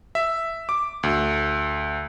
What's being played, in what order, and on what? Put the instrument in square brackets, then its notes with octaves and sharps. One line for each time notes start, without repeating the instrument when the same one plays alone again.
[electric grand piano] E5
D6
D2